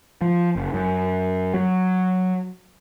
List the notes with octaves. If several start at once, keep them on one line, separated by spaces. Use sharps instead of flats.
F3
F#1
F#2
F#3